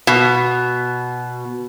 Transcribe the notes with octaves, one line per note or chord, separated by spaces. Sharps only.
B2